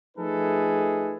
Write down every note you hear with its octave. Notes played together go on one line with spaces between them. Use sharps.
F3 A3 D#4 G#4 A4 B4